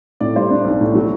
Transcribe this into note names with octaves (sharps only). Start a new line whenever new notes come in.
A2 D5
G3 C5
D4
B1
A2
F#3